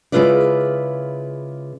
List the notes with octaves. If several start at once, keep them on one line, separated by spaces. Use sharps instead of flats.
C#3 G#3 E4 F4 B4 D5